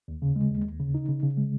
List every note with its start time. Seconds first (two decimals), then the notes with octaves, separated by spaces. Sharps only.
0.08 D#2
0.22 C#3
0.36 G#3
0.51 D#2
0.65 D#2
0.80 C#3
0.95 D#4
1.09 C#3
1.23 C#3
1.37 G#3